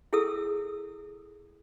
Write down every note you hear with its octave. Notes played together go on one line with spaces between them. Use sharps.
E4 G#4 A4 D#6 E6